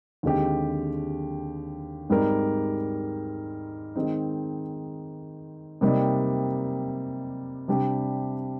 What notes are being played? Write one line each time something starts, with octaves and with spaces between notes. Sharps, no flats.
D#2 D3 G#3 C4 G4
G#2 G3 C4 D#4 A#4
D#3 G#3 C4 D#4
C3 G3 A#3 D#4
C3 G3 D4 G4